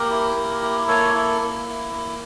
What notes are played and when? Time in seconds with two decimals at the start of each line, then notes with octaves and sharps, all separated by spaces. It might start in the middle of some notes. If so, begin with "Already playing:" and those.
Already playing: A#3 G4 A#4
0.10 E4
0.35 A#3
0.62 E4
0.88 A#3 A4 C#5
1.14 E4 A4
1.41 A#3
1.68 E4
1.93 A#3